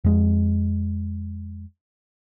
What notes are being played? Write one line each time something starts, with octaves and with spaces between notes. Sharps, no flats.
F2 G#3